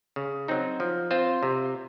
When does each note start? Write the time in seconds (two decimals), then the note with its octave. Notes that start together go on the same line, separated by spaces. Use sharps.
0.16 C#3
0.48 F#3 C4 D#4
0.80 F3
1.11 C4 F4 C5
1.43 C3